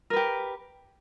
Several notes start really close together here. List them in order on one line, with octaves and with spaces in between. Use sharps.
A#4 B4 G4